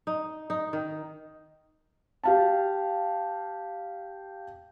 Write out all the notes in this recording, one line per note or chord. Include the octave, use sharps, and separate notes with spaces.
D#4
D#4
D#3
G4 F5 A5